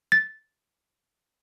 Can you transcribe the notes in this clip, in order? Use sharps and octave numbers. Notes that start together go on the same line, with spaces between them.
A6